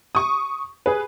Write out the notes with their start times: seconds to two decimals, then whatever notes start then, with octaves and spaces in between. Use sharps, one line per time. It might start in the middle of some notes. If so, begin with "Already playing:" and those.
0.15 C#6 D#6
0.86 G#4 B4